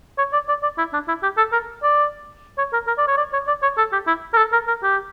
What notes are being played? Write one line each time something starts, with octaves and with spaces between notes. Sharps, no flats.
C#5
D5
D5
D5
E4
D4
E4
G4
A4
A#4
D5
C#5
A#4
A#4
D5
C#5
D5
C#5
D5
C#5
A4
G4
E4
A#4
A4
A#4
A#4
G4